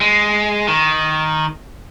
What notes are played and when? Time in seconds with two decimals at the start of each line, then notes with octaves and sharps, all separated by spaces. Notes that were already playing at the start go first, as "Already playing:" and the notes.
0.01 G#3
0.68 D#3